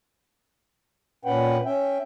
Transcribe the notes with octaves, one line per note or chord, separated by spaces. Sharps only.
A#2 C#4 B4 F#5 G5
C#4 E5 G5